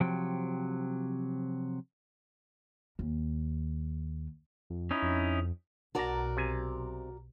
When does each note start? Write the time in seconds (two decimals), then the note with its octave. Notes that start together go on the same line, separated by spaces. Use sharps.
0.01 C3 F3 F#3 G5
2.99 D#2
4.70 F2
4.91 C#4 D#4 E4
5.02 F2
5.95 B1 F#4 A#4 D5 A5 A#5
6.37 C3 G#5